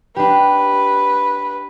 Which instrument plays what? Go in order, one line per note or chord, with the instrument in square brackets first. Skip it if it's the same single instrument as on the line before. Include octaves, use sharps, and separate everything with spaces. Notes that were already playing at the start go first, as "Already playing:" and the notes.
[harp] D4 G4 [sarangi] B4